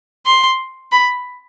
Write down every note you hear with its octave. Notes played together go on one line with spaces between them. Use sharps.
C6
B5